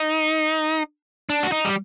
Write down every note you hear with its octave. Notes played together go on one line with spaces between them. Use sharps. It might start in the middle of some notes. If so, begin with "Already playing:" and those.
Already playing: D#4
D4
F#4
D#4
G3